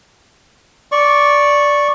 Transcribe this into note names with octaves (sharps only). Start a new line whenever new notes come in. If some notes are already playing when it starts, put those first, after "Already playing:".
D5 C#6